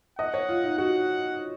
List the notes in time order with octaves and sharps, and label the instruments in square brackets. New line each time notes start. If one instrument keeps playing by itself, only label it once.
[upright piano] D#5 [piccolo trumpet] F#5
[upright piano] C#5
F4
D#4
[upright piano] F#4 [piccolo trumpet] F#5